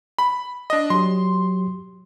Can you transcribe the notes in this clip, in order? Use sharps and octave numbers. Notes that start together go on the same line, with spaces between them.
B5
D4 D#5
F#3 G4 C6